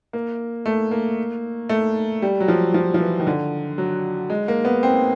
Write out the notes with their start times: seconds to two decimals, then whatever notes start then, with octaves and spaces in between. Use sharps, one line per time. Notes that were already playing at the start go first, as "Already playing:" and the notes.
0.13 A#3
0.66 A3
0.91 A#3
1.69 A3
2.22 G3
2.40 F#3
2.48 F3
2.74 F3
2.94 F3
3.00 E3
3.20 D#3
3.27 D3
3.78 F#3
4.30 G#3
4.48 A#3
4.65 B3
4.83 C4